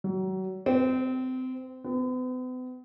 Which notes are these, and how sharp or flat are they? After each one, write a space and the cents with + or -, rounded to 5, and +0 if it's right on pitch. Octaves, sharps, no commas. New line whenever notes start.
F#3 +30
C4 -25
B3 +45